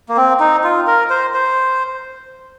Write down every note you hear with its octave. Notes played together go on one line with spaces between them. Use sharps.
A#3
C4
D#4
F4
A#4
C5
C5